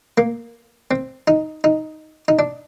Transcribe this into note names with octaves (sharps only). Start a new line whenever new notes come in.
A#3
C4
D#4
D#4
D#4
D4